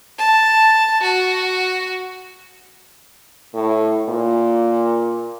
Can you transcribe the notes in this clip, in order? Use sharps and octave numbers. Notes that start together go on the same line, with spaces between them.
A5
F#4
A2
A#2